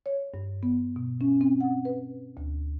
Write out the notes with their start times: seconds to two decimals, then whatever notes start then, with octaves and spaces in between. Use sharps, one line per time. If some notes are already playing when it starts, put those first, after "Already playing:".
0.06 C#5
0.34 G2
0.63 B3
0.96 B2
1.21 C#4
1.41 C4
1.61 F#5
1.85 B4
2.37 D2